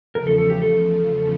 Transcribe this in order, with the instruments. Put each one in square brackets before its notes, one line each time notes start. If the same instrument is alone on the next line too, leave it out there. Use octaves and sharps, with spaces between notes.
[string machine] E2 C#3 F3 A3 [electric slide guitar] A#4
[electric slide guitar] A4
A4
G4
A4